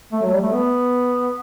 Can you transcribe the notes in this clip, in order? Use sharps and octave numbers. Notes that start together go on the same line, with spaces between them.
A3
F#3
G3
A3
B3